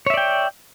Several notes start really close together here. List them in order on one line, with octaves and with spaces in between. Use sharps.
C#5 E5 D5 G5